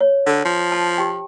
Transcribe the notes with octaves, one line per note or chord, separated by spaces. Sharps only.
C#5
D3
F3
A5
G4 G5